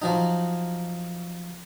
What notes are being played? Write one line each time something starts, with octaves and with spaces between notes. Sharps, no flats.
F3 F#3 D#4